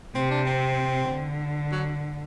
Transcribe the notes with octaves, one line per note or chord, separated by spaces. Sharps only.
C3 C4
D4
C4
D3
F#3